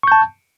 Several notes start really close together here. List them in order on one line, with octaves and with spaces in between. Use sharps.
C#6 G6 A5